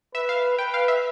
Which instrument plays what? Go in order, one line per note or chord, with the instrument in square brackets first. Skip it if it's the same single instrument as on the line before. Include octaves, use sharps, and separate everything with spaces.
[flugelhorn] B4 [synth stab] E5
[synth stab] F5
[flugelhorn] B4 [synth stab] G5
[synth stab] F5
E5